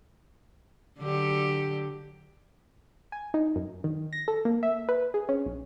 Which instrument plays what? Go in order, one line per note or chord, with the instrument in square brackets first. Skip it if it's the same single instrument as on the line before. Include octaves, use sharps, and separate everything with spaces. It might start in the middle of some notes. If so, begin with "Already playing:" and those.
[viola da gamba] D3 F#3 G4
[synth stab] G#5
D#4
F#2
D#3
A#6
A4
A#3
E5
B4
G#4
C#4
B1